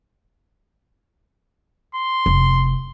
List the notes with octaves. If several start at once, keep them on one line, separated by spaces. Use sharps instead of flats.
C6
F1